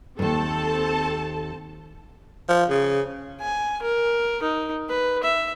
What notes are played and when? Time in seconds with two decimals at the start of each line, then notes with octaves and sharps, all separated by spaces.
0.19 D#2 G#2 C4 A4 A5
2.49 F3
2.70 C#3
3.41 G#5
3.82 A#4
4.42 D#4
4.89 B4
5.23 E5